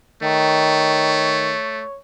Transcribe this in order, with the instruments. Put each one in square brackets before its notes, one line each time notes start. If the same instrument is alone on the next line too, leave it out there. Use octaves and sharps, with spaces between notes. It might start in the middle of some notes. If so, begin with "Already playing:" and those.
[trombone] D#3 [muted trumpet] A3 [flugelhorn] C#5